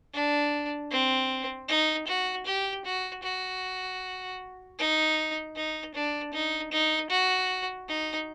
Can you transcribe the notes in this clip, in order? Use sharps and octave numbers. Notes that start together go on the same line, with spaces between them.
D4
C4
D#4
F#4
G4
F#4
F#4
D#4
D#4
D4
D#4
D#4
F#4
D#4